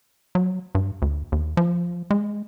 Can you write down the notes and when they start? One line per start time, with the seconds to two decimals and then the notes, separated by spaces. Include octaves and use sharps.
0.35 F#3
0.75 G2
1.02 D2
1.32 D#2
1.57 F3
2.11 G#3